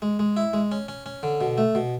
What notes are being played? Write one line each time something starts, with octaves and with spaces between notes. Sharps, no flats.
G#3
G#3
E4
G#3
C#4
C#4
C#4
D3
B2
A3
B2